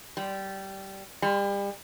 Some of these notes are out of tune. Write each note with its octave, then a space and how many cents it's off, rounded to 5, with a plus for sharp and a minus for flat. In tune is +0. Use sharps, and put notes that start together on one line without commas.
G3 -15
G3 +35